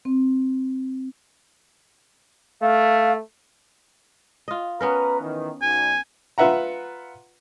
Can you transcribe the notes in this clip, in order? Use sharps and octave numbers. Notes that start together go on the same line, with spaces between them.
C4
A3 F5
F4 D#5
B3 C#4 A#4 B4 A#5
D#3 E3
B1 G#5
F4 B4 E5 F#5 A#5